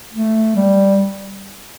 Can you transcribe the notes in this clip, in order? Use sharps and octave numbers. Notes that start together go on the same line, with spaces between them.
A3
G3